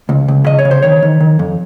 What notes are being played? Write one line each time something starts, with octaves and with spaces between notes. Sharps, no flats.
C#2
C#2
C#3 D#5
C#5
C#3
C5
D#3 C#5
D#3
D#3
F2